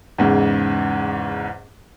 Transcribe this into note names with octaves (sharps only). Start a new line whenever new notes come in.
E2 G#2 C#3